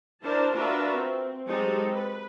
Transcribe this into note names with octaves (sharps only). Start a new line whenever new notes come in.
D4 E4 A#4 C5 A5
D4 F4 F#4 A#4 B4 E5
C4
F#3 G#3 C4 D#4 G4 A4
B4